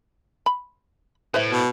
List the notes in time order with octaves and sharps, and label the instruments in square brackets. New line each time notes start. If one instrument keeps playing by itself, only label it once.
[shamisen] B5
[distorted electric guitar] A2 [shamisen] B4 C5 E5
[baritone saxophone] B2